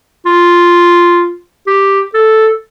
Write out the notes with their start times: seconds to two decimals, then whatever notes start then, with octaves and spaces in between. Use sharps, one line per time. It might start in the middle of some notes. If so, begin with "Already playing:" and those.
0.26 F4
1.67 G4
2.14 A4